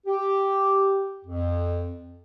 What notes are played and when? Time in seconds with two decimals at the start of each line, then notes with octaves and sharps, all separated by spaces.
0.07 G4
1.25 F2